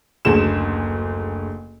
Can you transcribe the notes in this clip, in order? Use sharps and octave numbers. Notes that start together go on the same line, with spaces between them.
F#1 D2 G#4 E7